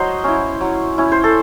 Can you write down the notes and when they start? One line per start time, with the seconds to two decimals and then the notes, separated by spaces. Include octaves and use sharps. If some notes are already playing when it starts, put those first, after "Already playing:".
Already playing: F#3 C5 D#5
0.24 C#4 E4
0.61 F#3
0.98 C#4 E4
1.12 C5
1.24 A4